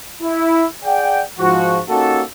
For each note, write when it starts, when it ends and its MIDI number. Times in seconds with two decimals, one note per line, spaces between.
0.23 0.64 64
0.84 1.22 68
0.84 1.22 74
0.84 1.22 78
0.84 1.22 79
1.39 1.81 44
1.39 1.81 53
1.39 1.81 66
1.88 2.22 58
1.88 2.22 61
1.88 2.22 63
1.88 2.22 66
1.88 2.22 67
1.88 2.22 69